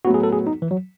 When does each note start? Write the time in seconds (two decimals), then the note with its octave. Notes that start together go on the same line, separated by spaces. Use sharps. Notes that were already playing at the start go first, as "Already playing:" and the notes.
0.05 A2 F#3 B3 F#4
0.14 G#4
0.23 A4
0.32 G#4
0.47 D#4
0.62 E3
0.71 F#3